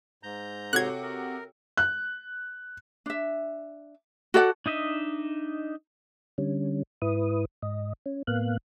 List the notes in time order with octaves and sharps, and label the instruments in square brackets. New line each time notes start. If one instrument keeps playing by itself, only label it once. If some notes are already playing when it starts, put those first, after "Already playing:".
[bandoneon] G#2 A#5 G6
[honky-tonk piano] C3 F#4 [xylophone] A4 C#5 C7 [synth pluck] F#6 G#6
[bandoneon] A#4
[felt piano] F#6
[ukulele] D4 E5
F#4 A4 D5 F#5
[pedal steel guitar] D4 D#4 D#5 E5
[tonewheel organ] D3 G3 C#4
G#2 E4 B4 D#6
G#2 D#5
C#4
A2 A#3 B3 F5 F#6